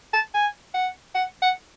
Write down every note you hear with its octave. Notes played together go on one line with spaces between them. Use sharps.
A5
G#5
F#5
F#5
F#5